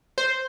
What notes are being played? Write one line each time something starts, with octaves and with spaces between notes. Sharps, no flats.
C5